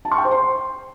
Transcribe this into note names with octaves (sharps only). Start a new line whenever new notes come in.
A5
C#6
G5
C5
C6